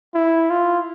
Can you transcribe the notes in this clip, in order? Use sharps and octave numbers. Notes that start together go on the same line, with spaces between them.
E4
F4